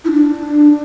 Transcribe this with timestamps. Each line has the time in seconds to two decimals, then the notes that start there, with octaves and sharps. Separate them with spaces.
0.05 E4
0.11 D4